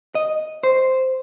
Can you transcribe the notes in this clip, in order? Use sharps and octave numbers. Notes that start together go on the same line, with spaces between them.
D#5
C5